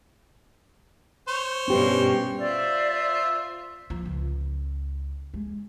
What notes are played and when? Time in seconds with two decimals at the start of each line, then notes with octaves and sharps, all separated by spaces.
1.28 C5 C#5
1.68 G2 B2 C#4 G4 B4
2.39 F4 C5 D5 E5
3.90 F3
4.05 C#2
5.34 G#3